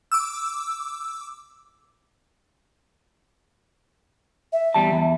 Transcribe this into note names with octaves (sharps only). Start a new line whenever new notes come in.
D6 E6
E5
E2 G3 A5
E2